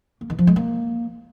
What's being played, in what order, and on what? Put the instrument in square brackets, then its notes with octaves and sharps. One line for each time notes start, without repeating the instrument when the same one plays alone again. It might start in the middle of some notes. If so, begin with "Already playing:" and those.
[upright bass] A#3
D#3
F3
G#3
A#3